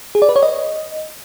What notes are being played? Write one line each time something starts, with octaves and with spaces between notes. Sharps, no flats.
G#4
D5
B4
C#5
D#5